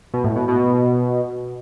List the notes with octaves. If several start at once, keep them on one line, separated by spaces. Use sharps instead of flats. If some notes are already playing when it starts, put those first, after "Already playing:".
B2
A2
B2
B2